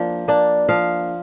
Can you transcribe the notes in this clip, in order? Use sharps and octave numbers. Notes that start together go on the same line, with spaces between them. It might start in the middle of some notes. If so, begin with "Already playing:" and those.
Already playing: F3 A#3 D4
A#3 D4
F3 F5